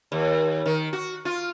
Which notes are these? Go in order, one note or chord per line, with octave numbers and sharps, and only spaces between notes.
D#2
D#3
F#4
F4